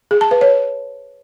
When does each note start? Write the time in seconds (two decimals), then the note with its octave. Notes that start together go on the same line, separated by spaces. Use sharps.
0.11 G#4
0.21 A5
0.31 B4
0.41 C#5